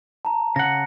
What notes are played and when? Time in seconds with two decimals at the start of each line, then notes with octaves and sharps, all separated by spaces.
0.25 A5 A#5
0.56 C#3 F#5 A#6 C#7